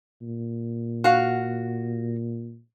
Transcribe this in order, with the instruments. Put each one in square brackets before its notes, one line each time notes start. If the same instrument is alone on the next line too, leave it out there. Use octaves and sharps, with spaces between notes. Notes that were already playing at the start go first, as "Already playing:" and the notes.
[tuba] A#2
[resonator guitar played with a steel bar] F#4 F5